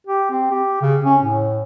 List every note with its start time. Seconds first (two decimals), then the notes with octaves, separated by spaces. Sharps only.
0.07 G4
0.31 C4
0.52 G4
0.82 C#3
1.05 C#4
1.22 A2